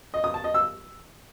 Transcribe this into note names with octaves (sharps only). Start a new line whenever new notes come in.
D#5
D#6
A5
D#5
E6